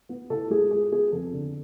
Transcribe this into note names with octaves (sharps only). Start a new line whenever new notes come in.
B3
A2 A4
G#3 G#4
F4 G#4
B3 G#4
F2 A4
D3